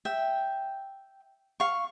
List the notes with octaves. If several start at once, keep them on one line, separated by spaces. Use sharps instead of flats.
E5 G5
F5 C#6